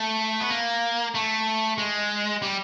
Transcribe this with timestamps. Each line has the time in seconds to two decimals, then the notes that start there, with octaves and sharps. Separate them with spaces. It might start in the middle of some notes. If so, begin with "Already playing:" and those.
Already playing: A3
0.41 B3
0.50 A#3
1.15 A3
1.78 G#3
2.42 G3